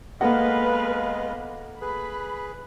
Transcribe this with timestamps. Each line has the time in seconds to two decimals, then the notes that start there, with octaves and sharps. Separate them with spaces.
0.21 G#3 A#3 B3 A4 B4 D#5 F5 F#5
1.81 G#4 B4 B5